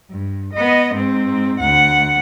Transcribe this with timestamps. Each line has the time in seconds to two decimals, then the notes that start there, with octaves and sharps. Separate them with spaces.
0.11 G2
0.53 B3 D#5
0.95 G#2 C4
1.60 D2 F#5